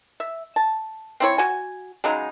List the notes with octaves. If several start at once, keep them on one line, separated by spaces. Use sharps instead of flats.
E5
A5
C4 E4 C#5
F#4 G#5
C#3 F#3 G#3 D#4